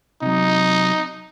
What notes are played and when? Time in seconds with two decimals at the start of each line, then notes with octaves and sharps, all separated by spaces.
0.22 C3 F#3 D#4